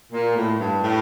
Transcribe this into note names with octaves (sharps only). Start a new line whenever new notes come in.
A#2
A2
G2
A2